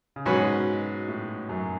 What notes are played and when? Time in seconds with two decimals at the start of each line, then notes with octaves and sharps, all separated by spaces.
0.16 C#3
0.26 G#2 B2 F#3 C#4 F#4 B4
1.08 A2
1.49 F#2